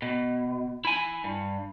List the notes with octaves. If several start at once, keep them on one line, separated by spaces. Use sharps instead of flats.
B2
E4 G#5
G2